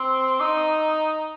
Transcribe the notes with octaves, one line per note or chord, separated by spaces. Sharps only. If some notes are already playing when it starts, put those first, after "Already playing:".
Already playing: C4
D#4